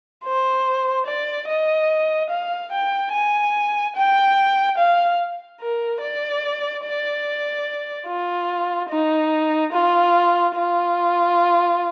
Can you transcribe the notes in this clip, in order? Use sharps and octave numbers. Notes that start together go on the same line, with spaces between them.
C5
D5
D#5
F5
G5
G#5
G5
F5
A#4
D5
D5
F4
D#4
F4
F4